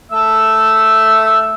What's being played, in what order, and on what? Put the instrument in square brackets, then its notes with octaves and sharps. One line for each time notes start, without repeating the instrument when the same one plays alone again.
[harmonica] A3 E5 E6